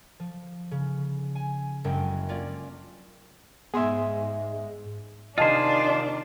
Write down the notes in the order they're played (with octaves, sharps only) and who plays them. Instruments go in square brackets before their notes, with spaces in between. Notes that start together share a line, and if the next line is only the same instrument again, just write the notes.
[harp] F3
C#3
G#5
F#1 F#2 G#3 G5
A#3 C#4 F4 D5
[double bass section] G#2 G#3 [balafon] B3 C6 [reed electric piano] G#4 E5
[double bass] C3 D#3 [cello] D4 [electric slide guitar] F4 C5 [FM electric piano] D#5 G#5 A5